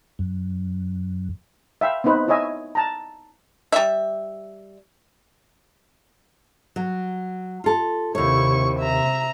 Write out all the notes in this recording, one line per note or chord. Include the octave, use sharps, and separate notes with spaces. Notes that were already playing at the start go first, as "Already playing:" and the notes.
F#2
E5 F5 G5
B3 C4 D#4 B4 C5
E4 C#5 D#5 E5 G#5
A5 A#5
G3 E5
F#3
F4 A4
D#2 C3 E4 C#5 C#6
E5 A#5